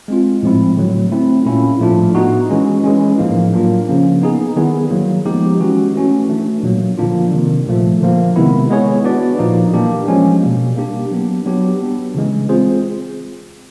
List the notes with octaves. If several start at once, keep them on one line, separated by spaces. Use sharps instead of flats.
G#3 C4 F4
A2 F3 G#3 C4 E4
D3 F#3 A3
A3 C4 E4
A#2 G3 A#3 C#4 E4
A2 F3 A3 D4 F4
B3 D#4 F#4
E3 G#3 C#4
E3 G#3 C#4
A2 F3 A#3 D#4
F#3 A#3 D4 F4
C#3 F3 A#3 C#4
B3 D#4 G#4
D#3 G3 B3 E4 G#4
D#3 F#3 A#3
F3 G#3 B3 D#4 G4
E3 G#3 C#4 F#4
E3 A3 C#4 F#4
E3 A3 D4
A#2 F#3 A#3
D3 F3 A#3 D4 F4
C3 D#3 G3
A#2 F3 A3
D3 F3 A#3
C3 D#3 G#3 B3 E4
G#3 B3 E4 G#4 C#5
B3 D4 F#4 B4 D5
A#2 F3 A#3 D#4
E3 G3 A#3 D4 G4
F3 G#3 C#4
B2 G3 A#3
A#3 D4 G4
F#3 B3 D4
F#3 B3 D4 G4
G3 B3 D4
C#3 E3 G#3
G#3 C4 F4 G#4 C5